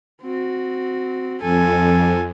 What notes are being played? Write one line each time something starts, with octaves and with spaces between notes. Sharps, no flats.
C4 F#4
F2 A4 G#5